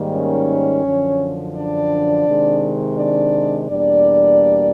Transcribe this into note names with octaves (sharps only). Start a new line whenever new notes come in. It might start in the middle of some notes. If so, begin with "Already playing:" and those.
Already playing: G#2 D#3 G3 A#3
C#4 C#5
F#2 D3 F3
D4 D5
C3 D#3 G#3
D4 D5
E2 B2 G3 A#3 D4 D5